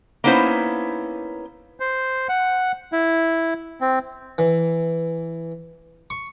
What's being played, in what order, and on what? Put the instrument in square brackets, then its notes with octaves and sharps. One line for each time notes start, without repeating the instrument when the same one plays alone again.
[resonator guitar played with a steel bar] A#3 B3 C#4 D#4 E4 C5
[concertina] C5
F#5
E4
C4
[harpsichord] E3
C#6